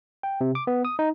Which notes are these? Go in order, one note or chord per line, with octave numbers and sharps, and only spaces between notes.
G5
C3
D6
B3
D#6
D#4